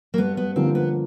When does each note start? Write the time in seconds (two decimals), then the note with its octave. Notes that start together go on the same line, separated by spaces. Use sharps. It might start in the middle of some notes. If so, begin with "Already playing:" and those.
0.14 A#3
0.18 G2 B3
0.37 B3
0.56 D3 F3 A#3 C4
0.75 B3